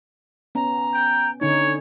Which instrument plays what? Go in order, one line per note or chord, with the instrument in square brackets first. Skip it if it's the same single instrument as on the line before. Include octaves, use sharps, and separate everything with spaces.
[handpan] B3 C#4 [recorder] A#5
[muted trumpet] G5
[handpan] D3 C#4 D#4 [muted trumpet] C#5